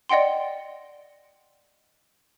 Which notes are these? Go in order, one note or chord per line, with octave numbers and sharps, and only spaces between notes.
D5 D#5 F#5 G5 C6